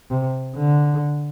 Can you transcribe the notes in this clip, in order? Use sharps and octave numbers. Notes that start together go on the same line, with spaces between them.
C3
D3